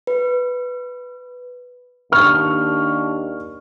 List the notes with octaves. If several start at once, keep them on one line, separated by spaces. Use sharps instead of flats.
B4
D#2 D4 C#6 F6